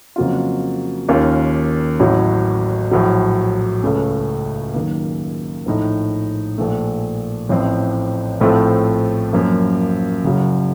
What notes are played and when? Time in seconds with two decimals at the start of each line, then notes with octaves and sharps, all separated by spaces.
0.16 F2 C#3 F#3 A#3 F4
1.09 D#2 D#3 A#3 C#4 F4
2.00 A1 A2 F#3
2.91 A#1 A2 F#3
3.83 C#2 C#3 A3 C#4
4.74 F#2 D#3 A#3
5.66 A#1 A2 A3 D#4
6.58 A#1 A#2 A3
7.49 A1 A2 F3 C4
8.41 A#1 A2 A3 C4 F4
9.33 F#2 F3 A#3
10.25 F#1 F#2 C#3 F#3